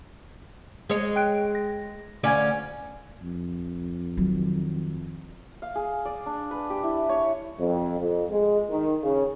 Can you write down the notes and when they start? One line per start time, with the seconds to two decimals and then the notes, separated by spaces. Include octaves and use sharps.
0.89 G#3 C#5
1.16 G5 F#6 D7
1.55 A#6
2.23 D2 C#4 D5 F5 G#5 G#6
3.21 F2
4.17 D#3 F#3
5.62 F5
5.75 G#4
6.05 D5
6.26 D4
6.51 B4
6.70 G4
6.83 E4
7.09 C#5
7.58 F2
8.00 F2
8.30 G#3
8.70 D#3
9.02 C#3